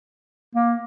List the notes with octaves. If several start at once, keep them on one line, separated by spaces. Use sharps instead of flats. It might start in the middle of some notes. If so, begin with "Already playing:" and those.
A#3